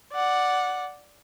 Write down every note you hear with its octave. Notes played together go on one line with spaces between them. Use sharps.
D5 F#5